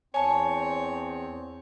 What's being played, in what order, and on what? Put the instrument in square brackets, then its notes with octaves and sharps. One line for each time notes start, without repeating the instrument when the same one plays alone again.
[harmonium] E2 C4 [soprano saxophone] C#5 [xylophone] G#5 A5